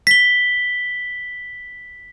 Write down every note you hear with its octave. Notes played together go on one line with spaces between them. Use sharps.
B6 G7